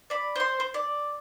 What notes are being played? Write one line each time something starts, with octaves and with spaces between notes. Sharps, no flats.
D5 B5
C5 C6
C5
D5